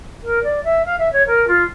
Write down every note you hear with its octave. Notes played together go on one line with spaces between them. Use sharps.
A#4
D5
E5
F5
E5
C#5
A#4
F4